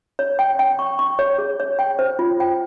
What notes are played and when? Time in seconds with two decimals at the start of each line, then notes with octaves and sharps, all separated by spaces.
0.19 C#5
0.39 G5
0.59 G5
0.79 C#6
0.99 C#6
1.19 C#5
1.38 G#4
1.60 C#5
1.79 G5
1.99 C5
2.19 F4
2.40 G5